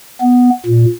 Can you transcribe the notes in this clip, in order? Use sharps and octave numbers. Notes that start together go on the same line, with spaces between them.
B3
A#2